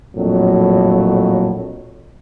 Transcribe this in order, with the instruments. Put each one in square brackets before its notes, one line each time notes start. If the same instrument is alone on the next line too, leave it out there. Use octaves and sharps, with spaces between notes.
[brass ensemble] A#1 F2 A2 F#3